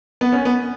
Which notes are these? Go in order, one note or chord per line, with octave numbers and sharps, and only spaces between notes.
B3
C#4
B3